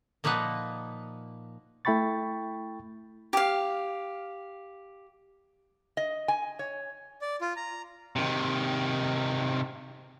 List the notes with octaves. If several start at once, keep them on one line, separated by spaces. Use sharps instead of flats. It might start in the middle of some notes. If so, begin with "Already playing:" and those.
A#2 F3 A#3 D#4 B4 F#5
A3 E4 G5 B5 C#6 A6
G4 F5
D#5
G#5
C#5
D5
F4
A#5
C3 D#3